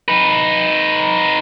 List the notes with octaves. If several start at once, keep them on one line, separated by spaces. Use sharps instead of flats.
D#4 B4